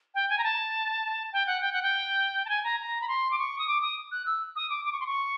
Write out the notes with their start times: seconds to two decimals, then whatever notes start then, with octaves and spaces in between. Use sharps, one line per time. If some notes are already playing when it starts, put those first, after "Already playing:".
0.15 G5
0.30 G#5
0.38 A#5
0.44 A5
1.33 G5
1.47 F#5
1.61 G5
1.73 F#5
1.82 G5
2.45 A5
2.49 G#5
2.64 A#5
2.80 A#5
3.01 B5
3.08 C6
3.31 D6
3.39 C#6
3.59 D#6
3.67 D6
3.82 D#6
4.12 F#6
4.26 E6
4.56 D#6
4.70 D6
4.85 D6
4.93 C#6
5.00 C6
5.06 C#6